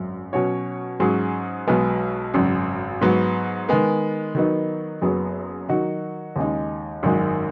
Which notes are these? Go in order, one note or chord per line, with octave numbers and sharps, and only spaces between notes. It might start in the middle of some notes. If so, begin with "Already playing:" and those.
Already playing: G#1 F#2 F#3
B2 F#3 C#4 F#4 C#5
G#2 F#3 C#4 G#4
B1 B2 G#3 B3
G#1 F#2 C#3
G#2 F#3 B3
D#3 G#3 B3
D#3 F#3 B3 D#4
F#1 F#2 F#3 B3 G#4
D#3 F#3 D#4 F#4
D#2 C#3 G#3 D#4
G#1 F#2 D#3 G#3